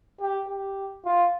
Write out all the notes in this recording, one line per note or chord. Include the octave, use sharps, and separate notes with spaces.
G4
G4
F4